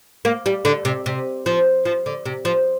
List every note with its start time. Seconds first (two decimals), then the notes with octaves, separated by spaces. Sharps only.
0.25 A#3
0.46 G3
0.65 D3
0.85 C3
1.06 C3
1.46 F3
1.85 F3
2.06 D3
2.25 C3
2.45 F3